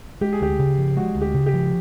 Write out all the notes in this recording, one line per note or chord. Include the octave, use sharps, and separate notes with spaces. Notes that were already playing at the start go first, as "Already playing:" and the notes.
G#3 G4
G#4
D2 G4
C#3
F3
G#3 F#4
D2
G4
C#3
G4
F3